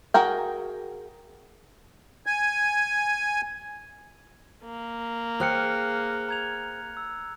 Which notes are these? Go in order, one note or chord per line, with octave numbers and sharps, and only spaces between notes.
F#4 G#4 A#4 G5
G#5
A#3
G#4 C5 G5 F6 F#6 C#7
A#5 G#6 F7
E6